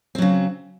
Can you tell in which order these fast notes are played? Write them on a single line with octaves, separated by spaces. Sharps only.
C4 F#3 C#3